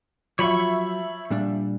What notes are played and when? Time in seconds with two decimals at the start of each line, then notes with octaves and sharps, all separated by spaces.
0.39 F3 F#3 C#5 E5 B5 C#6
1.30 A#2 G3 D4